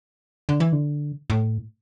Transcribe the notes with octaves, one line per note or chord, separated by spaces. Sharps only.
D3
E3
D3
A2